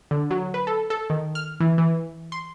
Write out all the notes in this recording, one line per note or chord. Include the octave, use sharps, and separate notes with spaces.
D3
F#3
B4
A4
A4
D#3
F6
E3
E3
C6